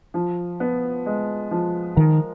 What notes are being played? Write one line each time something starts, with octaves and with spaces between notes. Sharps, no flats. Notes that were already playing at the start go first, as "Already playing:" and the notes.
F3
B3
G#3
F3
D#3 A#4